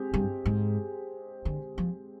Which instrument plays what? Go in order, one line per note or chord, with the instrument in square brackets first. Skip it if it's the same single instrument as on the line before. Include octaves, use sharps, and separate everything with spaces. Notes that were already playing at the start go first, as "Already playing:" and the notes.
Already playing: [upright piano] G#3 C4 G4
[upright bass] G2
G#2
D3
F3